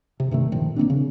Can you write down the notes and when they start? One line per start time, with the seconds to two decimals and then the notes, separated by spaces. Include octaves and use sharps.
0.20 C3
0.31 G2 C3 D#3 A3
0.52 G1 A#2 D#3 F3
0.76 D#3 A#3 C4 D4
0.90 C#3